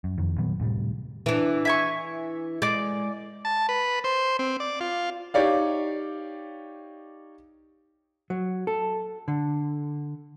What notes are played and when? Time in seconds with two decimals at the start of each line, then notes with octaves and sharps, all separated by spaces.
0.04 F#2
0.18 F1 F2 D#3
0.38 A#2 D#3 F#3 B3
0.60 D2 A2 C3 G3
1.26 E3 D4
1.65 E5 G#5 C#6
2.62 G#3 D5 D6
3.45 A5
3.69 B4
4.04 C5
4.39 C4
4.60 D5
4.80 F4
5.34 D#4 G4 C#5 D5 F5
8.30 F#3
8.67 A4
9.28 D3